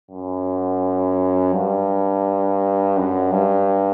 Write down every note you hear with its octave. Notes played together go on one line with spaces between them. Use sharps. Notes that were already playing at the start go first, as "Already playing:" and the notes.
F#2
G2
F#2
G2